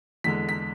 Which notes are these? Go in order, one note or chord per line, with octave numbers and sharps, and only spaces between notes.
E2 D3 G#3 B6
B6